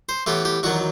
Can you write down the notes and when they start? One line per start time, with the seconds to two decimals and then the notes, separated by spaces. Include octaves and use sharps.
0.09 C5
0.27 A2 E3 B3 G4
0.45 G4
0.63 E2 D#3 F#3 F#4